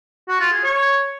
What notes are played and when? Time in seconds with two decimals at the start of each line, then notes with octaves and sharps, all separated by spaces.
0.29 F#4
0.40 F4
0.52 G#4
0.64 C#5